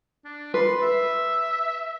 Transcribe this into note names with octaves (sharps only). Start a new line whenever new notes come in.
D4
B4 C6
E5